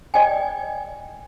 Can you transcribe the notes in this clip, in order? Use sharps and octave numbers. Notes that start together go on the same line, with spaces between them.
D5 D#5 G5 G#5